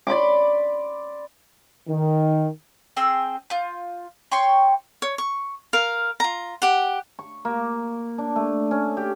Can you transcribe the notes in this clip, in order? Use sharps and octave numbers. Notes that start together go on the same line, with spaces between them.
D5 B5 C6 D6
D#3
C4 G#4 G5 E6
F4 G6
C#5 G5 C6 C#6
C#5
C#6
A#4 F5
F4 A#5
G4 F#5
C#6
A#3
D4
A3
C#4
G4